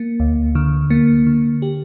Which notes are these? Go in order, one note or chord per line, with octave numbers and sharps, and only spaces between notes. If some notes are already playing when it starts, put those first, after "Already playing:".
Already playing: A#3
D2
D3
A#3
D3
G4